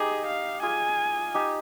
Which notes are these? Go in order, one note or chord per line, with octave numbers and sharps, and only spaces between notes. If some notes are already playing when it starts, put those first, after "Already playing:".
Already playing: D#4 G4 G#4
F5
F4 G#4 G#5
D#4 G4